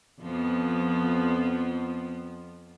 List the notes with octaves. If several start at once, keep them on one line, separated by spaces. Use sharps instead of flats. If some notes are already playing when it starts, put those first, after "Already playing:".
F2 F3 B3